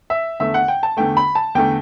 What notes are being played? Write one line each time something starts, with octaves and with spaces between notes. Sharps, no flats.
E5
E2 D3 A3 E5
F#5
G5
A5
E2 D3 A3 G5
B5
A5
E2 D3 A3 G5